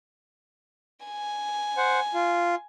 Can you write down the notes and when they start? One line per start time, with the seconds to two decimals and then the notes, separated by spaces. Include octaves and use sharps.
1.05 G#5
1.77 C5 F#5
2.14 F4